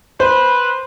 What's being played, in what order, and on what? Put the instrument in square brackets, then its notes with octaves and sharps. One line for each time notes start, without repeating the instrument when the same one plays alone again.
[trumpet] B4 [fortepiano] C5